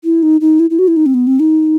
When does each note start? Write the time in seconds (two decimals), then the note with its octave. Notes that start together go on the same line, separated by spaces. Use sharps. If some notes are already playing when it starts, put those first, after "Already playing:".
0.04 E4
0.23 D#4
0.41 D#4
0.60 E4
0.70 E4
0.79 F#4
0.88 E4
0.97 D#4
1.06 C4
1.14 B3
1.27 C4
1.40 D#4